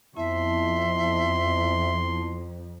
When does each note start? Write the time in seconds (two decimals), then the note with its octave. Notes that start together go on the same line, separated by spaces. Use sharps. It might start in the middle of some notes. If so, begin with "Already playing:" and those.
0.16 F2 B3 E4 E5 A5 C6